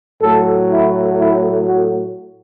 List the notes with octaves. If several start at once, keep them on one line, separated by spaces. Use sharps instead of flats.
A2 F#3 A3 A4
E4
E4
F#4